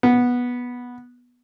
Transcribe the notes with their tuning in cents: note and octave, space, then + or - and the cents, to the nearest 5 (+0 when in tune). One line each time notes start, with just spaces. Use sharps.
B3 -10